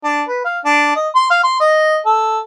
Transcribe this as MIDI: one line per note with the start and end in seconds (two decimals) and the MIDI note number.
0.04 0.23 62
0.28 0.40 71
0.45 0.60 77
0.65 0.91 62
0.96 1.09 75
1.15 1.29 84
1.30 1.41 77
1.44 1.59 84
1.60 2.00 75
2.06 2.40 69